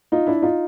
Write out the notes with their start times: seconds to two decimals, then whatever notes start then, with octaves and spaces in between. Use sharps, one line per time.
0.12 D#4 F4
0.27 D4 E4
0.42 D#4 F4